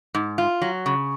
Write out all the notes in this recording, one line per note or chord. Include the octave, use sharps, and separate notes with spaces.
G#2
F4
F#3
C#3